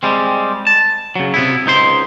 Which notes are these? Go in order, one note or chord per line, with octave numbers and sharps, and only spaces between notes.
G3 G#3 C4
A5
C#3 F#3
C3 B3 E4
C#2 D#4 C5 C6